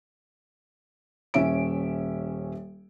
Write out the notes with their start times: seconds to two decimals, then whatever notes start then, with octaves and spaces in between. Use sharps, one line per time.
1.34 D#1 C#4 E5 D7